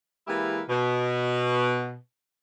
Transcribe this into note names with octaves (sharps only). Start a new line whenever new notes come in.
E3 G#3 A#3 E4 G4 A#4
B2